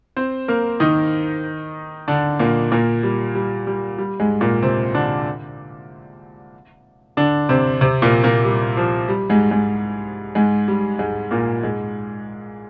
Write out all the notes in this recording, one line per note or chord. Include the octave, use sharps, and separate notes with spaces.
C4 C5
A#3 A#4
D#3 D#4
D3 D4
A#2 A#3
A#2 A#3
G3
G3
G3
G3
G#2 G#3
A#2 A#3
C3 C4
D3 D4
D3 D4
C3 C4
C3 C4
A#2 A#3
A#2 A#3
G3
F3
G3
G#2 G#3
G#2 G#3
G#2 G#3
G3
G#2 G#3
A#2 A#3
G#2 G#3